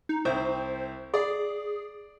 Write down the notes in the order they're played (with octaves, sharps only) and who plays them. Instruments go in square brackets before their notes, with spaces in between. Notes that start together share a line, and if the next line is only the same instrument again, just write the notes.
[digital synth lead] D#4
[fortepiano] C2 C4 [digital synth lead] C5
[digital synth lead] G#4 [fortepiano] D5